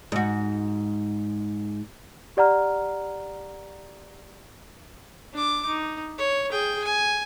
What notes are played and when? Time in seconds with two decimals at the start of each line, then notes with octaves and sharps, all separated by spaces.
0.12 G#2 F#4
2.37 G4 D5 F#5 A#5 F6
5.33 D4 D6
5.66 D#4
6.18 C#5
6.51 G#4 G5
6.84 G#5